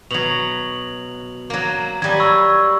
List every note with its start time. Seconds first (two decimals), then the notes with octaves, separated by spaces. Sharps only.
0.11 B2 F#3 F7 F#7
1.50 F#3 A#3
2.02 F#3 G3 G#5 G#6
2.19 B5 C#6 E6